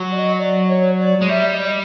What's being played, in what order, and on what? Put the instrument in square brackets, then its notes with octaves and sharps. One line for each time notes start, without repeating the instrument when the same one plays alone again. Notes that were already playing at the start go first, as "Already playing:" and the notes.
Already playing: [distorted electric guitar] F#3
[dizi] D5
D#5
D5
C#5
D5
[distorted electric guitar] G#3
[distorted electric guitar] G3 [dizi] E5
[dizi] D#5
D5
D#5